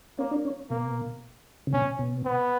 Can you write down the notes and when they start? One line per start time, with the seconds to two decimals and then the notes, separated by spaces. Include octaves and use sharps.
0.19 A#3 C#4
0.31 D4
0.45 C#4
0.70 B2 A#3
1.67 C#3
1.73 B2 C#4
1.99 B2
2.25 B3